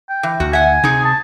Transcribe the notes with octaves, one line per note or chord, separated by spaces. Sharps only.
G5
E3
D2 F#4
E5 F#5 G#5
C3 D#4 G#4
A5